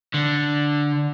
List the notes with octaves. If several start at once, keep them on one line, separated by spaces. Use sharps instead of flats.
D3